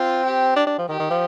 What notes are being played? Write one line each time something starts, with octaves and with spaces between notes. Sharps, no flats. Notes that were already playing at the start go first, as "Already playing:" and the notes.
Already playing: C4 F4
G4
D4
D4
F3
D#3 G4
D#3
F3